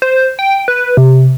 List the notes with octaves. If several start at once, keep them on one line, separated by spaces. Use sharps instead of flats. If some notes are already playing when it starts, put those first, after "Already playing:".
C5
G5
B4
C3